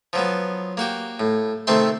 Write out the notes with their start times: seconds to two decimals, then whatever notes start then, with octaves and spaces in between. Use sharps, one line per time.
0.13 F3 F#3 B3
0.77 A#3 F#4 G4
1.20 A2
1.67 C3 D#3 A3 C4 E5 C6